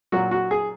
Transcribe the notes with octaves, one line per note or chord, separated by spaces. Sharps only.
A#2 F#3 F#4
F#4
G#4